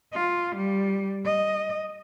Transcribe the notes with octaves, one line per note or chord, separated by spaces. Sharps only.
F4
G3
D#5